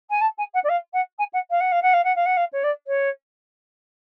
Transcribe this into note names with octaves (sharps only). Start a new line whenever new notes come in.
G#5
A5
G#5
F#5
D5
F5
F#5
G#5
F#5
F5
F#5
F5
F#5
F5
F#5
F5
F#5
F5
C#5
D5
C#5